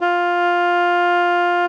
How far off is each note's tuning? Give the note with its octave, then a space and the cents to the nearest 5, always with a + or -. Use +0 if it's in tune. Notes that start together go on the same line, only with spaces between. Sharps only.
F4 +10